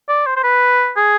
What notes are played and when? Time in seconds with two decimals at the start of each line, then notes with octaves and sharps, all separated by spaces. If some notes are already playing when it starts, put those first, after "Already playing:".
0.08 D5
0.26 C5
0.36 C5
0.44 B4
0.96 G#4